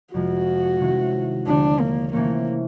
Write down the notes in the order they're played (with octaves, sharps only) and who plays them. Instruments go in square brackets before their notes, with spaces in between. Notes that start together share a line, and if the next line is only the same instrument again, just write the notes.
[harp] F2 C3 F3 G#3 [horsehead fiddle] F#4
[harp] C3 D#3 G#3 C#4 E4
[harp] D#2 D3 F3 A3 [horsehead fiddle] D4
[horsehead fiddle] A#3
[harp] C3 E3 A3 C#4 [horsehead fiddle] A#3